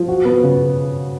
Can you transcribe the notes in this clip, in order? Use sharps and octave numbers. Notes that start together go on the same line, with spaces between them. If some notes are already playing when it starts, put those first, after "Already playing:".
Already playing: F3
F#4
B3
C#3